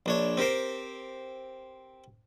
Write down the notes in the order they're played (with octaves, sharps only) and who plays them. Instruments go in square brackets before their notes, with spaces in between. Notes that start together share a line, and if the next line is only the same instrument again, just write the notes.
[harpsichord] A#1 D4 C#5
C4 G4 A#4 C5